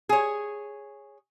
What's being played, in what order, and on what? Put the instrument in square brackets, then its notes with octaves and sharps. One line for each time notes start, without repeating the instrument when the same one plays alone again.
[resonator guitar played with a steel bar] G#4 C#5